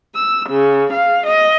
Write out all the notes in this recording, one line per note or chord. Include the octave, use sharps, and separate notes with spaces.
E6
C#3
F5
D#5